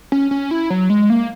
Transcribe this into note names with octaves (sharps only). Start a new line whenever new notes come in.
C#4
C#4
E4
F#3
G#3
A#3